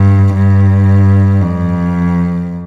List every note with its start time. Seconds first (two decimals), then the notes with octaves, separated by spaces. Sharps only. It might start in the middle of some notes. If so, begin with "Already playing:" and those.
Already playing: G2
0.34 G2
1.41 F2